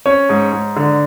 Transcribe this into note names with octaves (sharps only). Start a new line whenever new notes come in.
C#4 C#5
G#2
G#2
D3